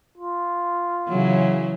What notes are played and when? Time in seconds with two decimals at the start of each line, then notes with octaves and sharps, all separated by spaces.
0.17 F4
1.08 C#3 E3 F#3